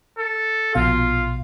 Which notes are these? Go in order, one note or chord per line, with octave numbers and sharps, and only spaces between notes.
A4
A#1 B2 F4 F5